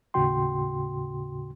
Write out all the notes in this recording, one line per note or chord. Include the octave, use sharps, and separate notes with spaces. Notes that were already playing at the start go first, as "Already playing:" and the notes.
D#2 A2 C#3 F#4 G5 C6